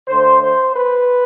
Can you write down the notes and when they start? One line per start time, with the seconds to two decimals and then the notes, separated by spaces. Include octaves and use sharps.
0.08 D3 A3 C5
0.41 C5
0.74 B4